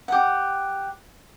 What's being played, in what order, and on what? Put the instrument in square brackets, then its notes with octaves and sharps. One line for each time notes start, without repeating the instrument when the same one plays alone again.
[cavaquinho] G4 F#5